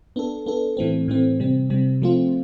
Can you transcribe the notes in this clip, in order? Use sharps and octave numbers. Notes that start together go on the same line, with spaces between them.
B3 D4 A4
B3 D4 A4
A2 E3 A3 C4
A2 E3 A3 C4
C3 G3 C4
C3 G3 C4
F3 A3 C4 F4